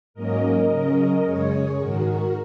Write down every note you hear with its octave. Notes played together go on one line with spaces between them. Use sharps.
G#2 F#3 A#3 C#4 A#4 D#5
C#3 F#3 C#4
F#2 C#3 G#3 C#4 G#4 C#5
G#2 D#3 G#3 F#4 A#4